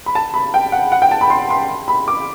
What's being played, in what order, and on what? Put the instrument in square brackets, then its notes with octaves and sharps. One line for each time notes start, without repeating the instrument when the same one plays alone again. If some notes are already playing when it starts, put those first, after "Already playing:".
[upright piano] B5
A5
B5
G5
F#5
F#5
G5
A5
B5
C6
C6
B5
D6